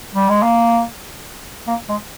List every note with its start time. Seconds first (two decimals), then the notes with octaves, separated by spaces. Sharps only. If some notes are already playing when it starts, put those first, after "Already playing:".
0.15 G3
0.29 G#3
0.43 A#3
1.67 A#3
1.89 G#3